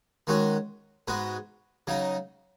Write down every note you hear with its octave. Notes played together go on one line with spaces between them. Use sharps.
D#3 G#3 C#4 F#4
G#2 G#3 B3 F#4
C#3 F#3 D#4